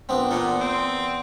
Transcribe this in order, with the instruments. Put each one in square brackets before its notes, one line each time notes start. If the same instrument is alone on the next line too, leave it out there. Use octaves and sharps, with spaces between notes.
[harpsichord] A#1 B3 C4 [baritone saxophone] D4
[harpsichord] E2 B3 [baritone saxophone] A#2
[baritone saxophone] C4